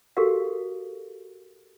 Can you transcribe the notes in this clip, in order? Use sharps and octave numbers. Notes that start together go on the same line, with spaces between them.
F#4 G4 A4 A#4 F5